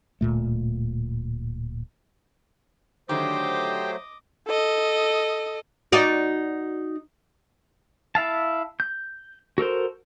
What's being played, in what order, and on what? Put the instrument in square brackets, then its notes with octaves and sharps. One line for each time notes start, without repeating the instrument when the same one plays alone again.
[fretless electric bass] D1 G#1 A#2 A3
[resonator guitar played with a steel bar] D3 D#3 [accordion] F#3 A3 C5 [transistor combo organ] G4 [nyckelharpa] D#5 D6
[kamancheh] A4 D#5
[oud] D#4 F#4 D5
[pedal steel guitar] E4 E5 F5 A5
G6
F#4 A4 A#4 C5